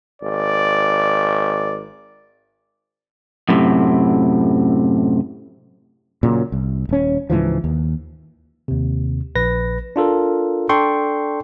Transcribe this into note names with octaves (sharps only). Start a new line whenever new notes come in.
G#1 D5
F#2 A2 C3
A#2 C#3 F#3
C2
D#1 C#4
C#2 G#2 E3 F3
D#2
D#2 C3
A#1 B4 A#6
D4 F4 A4 A#4
D4 A4 D5 G5 C6 C#6